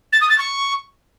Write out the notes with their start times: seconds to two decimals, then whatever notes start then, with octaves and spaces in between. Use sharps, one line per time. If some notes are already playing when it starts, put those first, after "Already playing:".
0.12 A6
0.21 D#6
0.30 A6
0.38 C#6